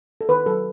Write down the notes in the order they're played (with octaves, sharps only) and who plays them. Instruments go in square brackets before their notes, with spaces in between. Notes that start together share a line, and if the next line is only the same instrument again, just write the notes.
[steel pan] A4
D#3 B4
F#3 A4